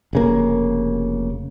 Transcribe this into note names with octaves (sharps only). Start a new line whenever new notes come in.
F1 C#3 A#3